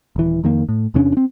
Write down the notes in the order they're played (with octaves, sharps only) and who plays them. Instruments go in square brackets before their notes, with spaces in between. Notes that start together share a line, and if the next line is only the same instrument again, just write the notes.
[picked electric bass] D#1 E3
F2 D#3 A#3
A2
E2 C3 C#4 D4
C4 D4